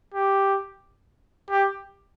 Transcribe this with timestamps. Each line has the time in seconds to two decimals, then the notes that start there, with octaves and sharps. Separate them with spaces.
0.14 G4
1.50 G4